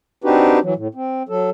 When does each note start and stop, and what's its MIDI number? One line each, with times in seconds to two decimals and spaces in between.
0.24 0.59 60
0.24 0.59 62
0.24 0.59 63
0.24 0.59 66
0.24 0.59 67
0.24 0.59 71
0.63 0.74 52
0.63 0.74 54
0.76 0.88 45
0.95 1.23 60
1.29 1.50 54
1.29 1.50 69